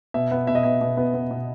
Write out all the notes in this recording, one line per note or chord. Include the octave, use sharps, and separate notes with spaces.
B2 E5
B3
B2 E5
D#5
B2 E5
B2
B3
B3
B2